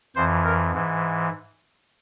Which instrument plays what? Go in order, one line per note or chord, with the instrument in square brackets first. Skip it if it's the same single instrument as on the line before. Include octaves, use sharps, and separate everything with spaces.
[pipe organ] F2 E3 C5
A#4
G#2 E3